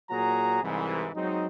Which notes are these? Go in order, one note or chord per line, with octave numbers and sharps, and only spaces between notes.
A#2 F#3 F#4 G#4 A#5
C2 G#2 E3
F#3 G#3 C4 D#4